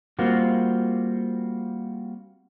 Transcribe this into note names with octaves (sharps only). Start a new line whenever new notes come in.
G3 A#3 C4 F4 F#4